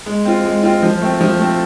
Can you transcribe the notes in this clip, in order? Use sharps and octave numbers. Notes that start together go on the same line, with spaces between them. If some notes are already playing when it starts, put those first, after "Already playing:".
G#3
C4 F4
G#3
C4 F4
F3
A3 C4
F3
A3 C4